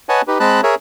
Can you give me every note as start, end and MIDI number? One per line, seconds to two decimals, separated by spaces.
0.09 0.22 71
0.09 0.22 73
0.09 0.22 75
0.09 0.22 78
0.09 0.22 80
0.09 0.22 81
0.28 0.38 63
0.28 0.38 67
0.28 0.38 71
0.40 0.61 56
0.40 0.61 60
0.40 0.61 75
0.40 0.61 81
0.40 0.61 83
0.40 0.61 90
0.63 0.75 68
0.63 0.75 70
0.63 0.75 73
0.63 0.75 76